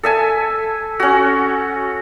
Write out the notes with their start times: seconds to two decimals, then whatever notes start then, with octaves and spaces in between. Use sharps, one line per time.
0.03 A4 E5 G#5
1.00 C#4 F#4